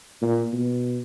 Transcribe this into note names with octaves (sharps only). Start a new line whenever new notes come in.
A#2
B2